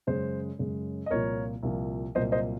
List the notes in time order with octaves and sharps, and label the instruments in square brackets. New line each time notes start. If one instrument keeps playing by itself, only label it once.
[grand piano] F#2 C#3 G#3 C5
F#2 C#3 G#3
D#5
C2 A#2 F3 A#3 A#4 C#5
C2 A#2 F3 A#3
C2 A#2 F#3 A#3 C5 D#5
C5 D#5